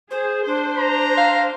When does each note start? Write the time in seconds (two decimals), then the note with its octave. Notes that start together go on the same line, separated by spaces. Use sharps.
0.11 G#4 C5
0.46 D4 C5
0.78 A#5
1.18 F5